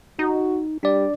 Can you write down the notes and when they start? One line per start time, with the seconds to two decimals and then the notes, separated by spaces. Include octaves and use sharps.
0.19 D#4 F#4
0.83 G3 D4 D5